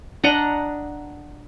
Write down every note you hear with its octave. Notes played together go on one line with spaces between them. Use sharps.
D4 D#5 F#5 A#5